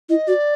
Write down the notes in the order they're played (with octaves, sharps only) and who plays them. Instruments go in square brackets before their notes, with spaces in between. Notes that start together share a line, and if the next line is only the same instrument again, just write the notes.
[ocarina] E4 [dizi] D#5
[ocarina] F#4 [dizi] D5